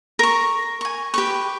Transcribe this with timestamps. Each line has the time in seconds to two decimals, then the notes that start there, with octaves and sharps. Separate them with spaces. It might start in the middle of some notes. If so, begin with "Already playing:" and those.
0.19 A#4 C#6
0.81 G#5 C#6
1.14 G4 B4 C#6